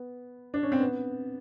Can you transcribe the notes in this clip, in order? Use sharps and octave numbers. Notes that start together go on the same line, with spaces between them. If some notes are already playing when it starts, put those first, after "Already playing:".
Already playing: B3
D4
C#4
C4
B3